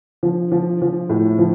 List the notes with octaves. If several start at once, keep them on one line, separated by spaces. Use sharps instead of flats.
F3
F3
F3
A2
F3